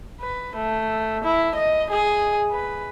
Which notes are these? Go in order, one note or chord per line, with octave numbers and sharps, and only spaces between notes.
B4
A3
E4
D#5
G#4
B4